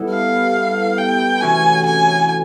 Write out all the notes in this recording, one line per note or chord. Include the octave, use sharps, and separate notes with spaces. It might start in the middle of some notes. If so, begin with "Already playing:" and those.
Already playing: G3 B3 E4 A4
F5
G5
C3 E3 A3 C#4 F#4 G#5
G#5